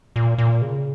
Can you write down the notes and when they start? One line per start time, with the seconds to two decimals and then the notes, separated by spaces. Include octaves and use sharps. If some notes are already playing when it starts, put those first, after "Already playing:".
0.16 A#2
0.38 A#2
0.62 C#3